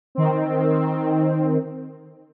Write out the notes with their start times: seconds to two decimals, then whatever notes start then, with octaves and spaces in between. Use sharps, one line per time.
0.15 D#3 C4